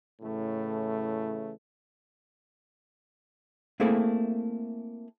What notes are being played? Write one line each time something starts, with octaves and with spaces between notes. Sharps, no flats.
A2 C#3 E3 A3
A3 A#3 C4 E4 G#4 A4